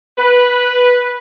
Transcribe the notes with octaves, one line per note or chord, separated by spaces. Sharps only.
B4